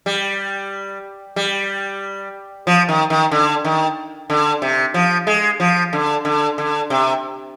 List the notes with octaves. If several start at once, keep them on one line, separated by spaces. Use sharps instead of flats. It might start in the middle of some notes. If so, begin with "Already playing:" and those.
G3
G3
F3
D#3
D#3
D3
D#3
D3
C3
F3
G#3
F3
D3
D3
D3
C3